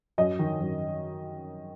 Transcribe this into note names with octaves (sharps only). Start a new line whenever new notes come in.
F#2 D#5
D#3
F#2